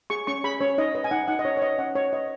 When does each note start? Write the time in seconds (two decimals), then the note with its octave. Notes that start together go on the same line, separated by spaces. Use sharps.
0.10 G#4 C#6
0.27 C#4 C#6
0.44 G#4 B5
0.61 C#4 C#5
0.78 D#4 D#5
0.95 B4 D#5
1.04 G#5
1.11 D#4 F#5
1.28 D#4 F#5
1.39 D#5
1.45 C#4 C#5
1.57 C#5
1.62 B4 D#5
1.78 C#4 F#5
1.95 C#4 C#5
2.13 B4 D#5